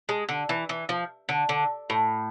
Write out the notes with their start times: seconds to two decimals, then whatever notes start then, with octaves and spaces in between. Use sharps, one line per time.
0.09 G#3
0.29 D3
0.49 E3
0.69 E3
0.89 F3
1.29 D3
1.49 D3
1.90 A2